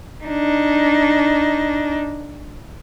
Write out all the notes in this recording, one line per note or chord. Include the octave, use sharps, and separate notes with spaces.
D4 D#4